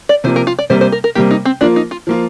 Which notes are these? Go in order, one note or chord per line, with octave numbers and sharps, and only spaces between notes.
D5
C3 F3 A#3 C5
A#4
F4
D5
C3 G3 A#3 C5
C5
A#4
A#4
C3 G3 A#3 G4
D#4
C4
F3 A#3 D4 F4
D#4
F4
F3 A#3 F4